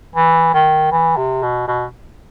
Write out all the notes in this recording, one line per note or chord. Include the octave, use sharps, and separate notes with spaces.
E3
D#3
E3
C3
B2
B2